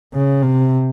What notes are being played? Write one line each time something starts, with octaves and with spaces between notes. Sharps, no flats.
C#3
C3